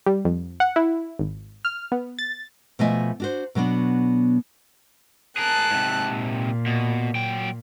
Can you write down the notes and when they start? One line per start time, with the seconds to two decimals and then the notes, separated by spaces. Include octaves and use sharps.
0.06 G3
0.25 F2
0.60 F#5
0.76 E4
1.19 G#1
1.65 F6
1.92 B3
2.19 A6
2.79 B2 F3 A3 D#5 E5 G#5
3.20 D4 F#4 C5
3.55 B2 F#3 B3 D4
5.38 G#4 A#4 A5 F#6
5.71 G#2 C3
6.11 A#2
6.66 B2
7.16 F#3 G5